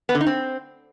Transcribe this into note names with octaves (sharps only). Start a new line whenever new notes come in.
B3
D3
D#4
C4